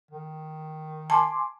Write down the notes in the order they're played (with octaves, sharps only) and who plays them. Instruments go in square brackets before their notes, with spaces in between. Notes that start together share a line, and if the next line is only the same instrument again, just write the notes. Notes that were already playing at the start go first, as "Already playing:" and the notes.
[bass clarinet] D#3
[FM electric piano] G#5 C6 D6 [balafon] A5